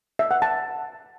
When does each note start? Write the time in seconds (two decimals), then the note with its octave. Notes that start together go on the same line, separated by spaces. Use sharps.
0.19 E5
0.31 F#5
0.42 A5